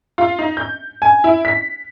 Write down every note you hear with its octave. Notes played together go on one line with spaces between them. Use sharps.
F4
D#4
G6
G#5
E4
B6